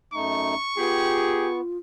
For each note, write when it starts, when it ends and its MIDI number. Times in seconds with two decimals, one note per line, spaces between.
0.13 0.55 42
0.13 0.55 57
0.13 0.55 63
0.13 1.61 85
0.77 1.61 59
0.77 1.78 65
0.77 1.47 67
0.77 1.47 68